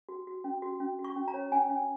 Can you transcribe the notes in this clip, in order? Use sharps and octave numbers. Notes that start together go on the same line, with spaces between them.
F#4
F#4
C#4
F#4
C#4
F#4
C#6
C#4
A#5
C#5
C#4 G#5
C#4